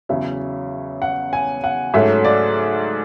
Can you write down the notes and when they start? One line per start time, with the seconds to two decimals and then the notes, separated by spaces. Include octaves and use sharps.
0.09 E2 C#3 F#3 C#4 E5
1.02 F#5
1.33 G#5
1.64 F#5
1.94 G#2 F#3 A3 C#4 E5
2.25 D5